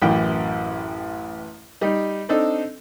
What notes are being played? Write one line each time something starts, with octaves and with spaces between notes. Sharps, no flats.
A1 F#2 E3 E4 G5
G3 D#4
C4 D4 D#4 A4